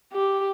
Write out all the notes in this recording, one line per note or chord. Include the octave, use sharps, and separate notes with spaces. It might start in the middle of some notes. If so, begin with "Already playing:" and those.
G4